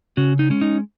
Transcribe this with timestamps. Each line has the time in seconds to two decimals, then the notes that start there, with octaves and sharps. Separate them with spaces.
0.17 C#3 C#4 F#4
0.39 D#4
0.50 G#3 C#4
0.61 D#4